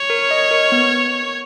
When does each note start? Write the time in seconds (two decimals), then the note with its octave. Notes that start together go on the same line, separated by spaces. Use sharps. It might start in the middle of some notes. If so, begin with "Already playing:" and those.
Already playing: C#5
0.10 A#4
0.31 D#5
0.51 A#4
0.72 B3